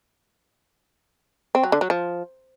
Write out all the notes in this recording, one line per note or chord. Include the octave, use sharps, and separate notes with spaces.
C4
F#3
D3
F#3
F3